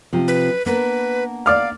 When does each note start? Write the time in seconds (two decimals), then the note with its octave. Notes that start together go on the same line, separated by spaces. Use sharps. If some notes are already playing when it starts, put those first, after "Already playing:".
0.13 C3 F3
0.28 B4
0.66 A#3 B3 D4 B4
1.46 D5 F5 D6 F6